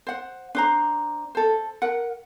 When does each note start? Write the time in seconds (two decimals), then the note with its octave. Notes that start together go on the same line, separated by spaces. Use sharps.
0.07 C5 F#5
0.55 D4 C5 A#5
1.35 A4 C5
1.82 A#4 F#5